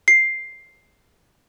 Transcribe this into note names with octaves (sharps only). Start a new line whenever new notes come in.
C7